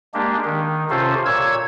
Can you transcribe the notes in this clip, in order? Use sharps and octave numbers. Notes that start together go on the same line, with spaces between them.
G#3 A#3 D4 G4
D#3
C3 C#4 F4 A4 C5
A#2 C#5 E6 G#6